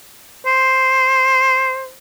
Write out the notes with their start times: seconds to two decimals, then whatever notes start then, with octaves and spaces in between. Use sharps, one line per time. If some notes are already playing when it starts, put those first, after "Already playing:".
0.46 C5